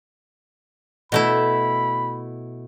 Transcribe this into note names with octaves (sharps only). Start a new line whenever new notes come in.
B2 A3 E4 B5